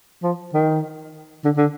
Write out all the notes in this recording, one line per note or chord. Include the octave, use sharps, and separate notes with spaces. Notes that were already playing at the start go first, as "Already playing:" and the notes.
F3
D#3
D3
D3